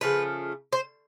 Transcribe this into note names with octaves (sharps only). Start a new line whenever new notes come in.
C#3 F3 A3 B4
C5